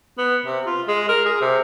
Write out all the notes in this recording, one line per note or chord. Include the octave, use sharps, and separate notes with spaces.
B3
C3
F4
G#3
A#4
G#4
C3